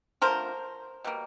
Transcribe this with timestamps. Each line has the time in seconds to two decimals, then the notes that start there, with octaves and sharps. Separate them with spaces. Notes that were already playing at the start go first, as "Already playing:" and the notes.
0.22 D3 F3 A3 A#4 C5
1.04 B2 G3 A#3